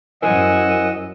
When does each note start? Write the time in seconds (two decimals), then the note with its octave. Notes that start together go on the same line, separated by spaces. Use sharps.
0.22 F#2 E4 A#4 C5 D#5 F#5 G#5 E6